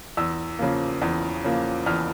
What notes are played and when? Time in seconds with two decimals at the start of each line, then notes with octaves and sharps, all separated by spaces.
0.17 E2 E6
0.59 C#3 F3 A#3
1.01 E2
1.44 C#3 F3 A#3
1.86 E2 F6